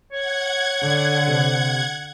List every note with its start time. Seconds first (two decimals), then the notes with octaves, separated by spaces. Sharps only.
0.12 C#5 F#5 G#6
0.82 D3
1.28 C3